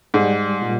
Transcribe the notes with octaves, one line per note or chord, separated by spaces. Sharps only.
G#2 G3
A#2